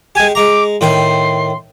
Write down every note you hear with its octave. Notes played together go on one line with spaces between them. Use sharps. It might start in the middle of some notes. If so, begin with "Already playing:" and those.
G#3 G4 G#5
G#3 A#5 D6
A2 D#3 G5 C6